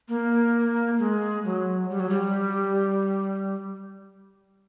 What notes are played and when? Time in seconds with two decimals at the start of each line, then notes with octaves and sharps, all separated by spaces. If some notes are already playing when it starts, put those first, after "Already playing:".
0.09 A#3
0.99 G#3
1.45 F#3
1.90 G3
2.00 F#3
2.09 G3